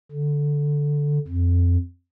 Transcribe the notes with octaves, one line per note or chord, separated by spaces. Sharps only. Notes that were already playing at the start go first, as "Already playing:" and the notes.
D3
F2